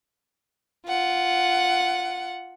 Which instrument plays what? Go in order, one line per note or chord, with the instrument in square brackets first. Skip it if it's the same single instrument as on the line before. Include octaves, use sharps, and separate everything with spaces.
[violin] F4 F#5